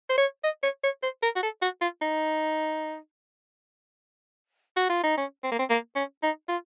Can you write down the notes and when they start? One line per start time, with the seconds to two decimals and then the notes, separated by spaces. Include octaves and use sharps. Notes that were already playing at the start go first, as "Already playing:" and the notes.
0.10 C5
0.18 C#5
0.44 D#5
0.63 C#5
0.84 C#5
1.03 C5
1.23 A#4
1.36 F#4
1.43 A4
1.62 F#4
1.81 F4
2.02 D#4
4.77 F#4
4.90 F4
5.04 D#4
5.17 C#4
5.43 C4
5.52 A#3
5.59 C4
5.70 A#3
5.96 C#4
6.23 D#4
6.48 F4